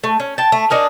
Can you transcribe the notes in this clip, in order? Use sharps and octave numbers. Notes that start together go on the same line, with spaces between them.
A3
C#4
G5 A5
A3
D4 D#4 A#4 G#5